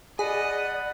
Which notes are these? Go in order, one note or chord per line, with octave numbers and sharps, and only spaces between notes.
G#4 D5 D#5 F#5 B5